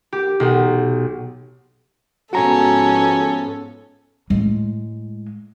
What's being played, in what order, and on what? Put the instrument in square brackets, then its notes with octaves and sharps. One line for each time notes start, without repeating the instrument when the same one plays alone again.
[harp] G4
B1
[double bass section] G#2 F3 B3 [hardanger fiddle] C#4 [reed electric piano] F#4 A#5 [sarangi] A4
[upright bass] A2 G#3